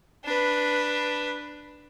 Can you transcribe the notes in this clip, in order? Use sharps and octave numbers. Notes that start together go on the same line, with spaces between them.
D4 B4